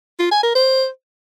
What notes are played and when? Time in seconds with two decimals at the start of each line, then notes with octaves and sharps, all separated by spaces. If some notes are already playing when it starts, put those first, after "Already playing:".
0.20 F4
0.31 G#5
0.43 A#4
0.55 C5